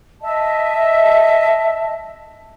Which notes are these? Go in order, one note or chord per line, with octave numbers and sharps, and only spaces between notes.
D#5 E5 A5